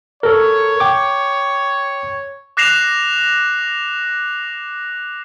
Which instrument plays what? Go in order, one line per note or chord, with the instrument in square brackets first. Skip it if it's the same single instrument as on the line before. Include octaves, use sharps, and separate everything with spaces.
[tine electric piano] A4 A#4 [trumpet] C#5
[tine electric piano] G5 D6
[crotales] D6 F#6 A#6 C7 E7 F7